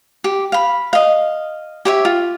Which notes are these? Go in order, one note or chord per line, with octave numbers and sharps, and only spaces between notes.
G4
F5 B5
D#5 F5
G4 C#5 E5
F4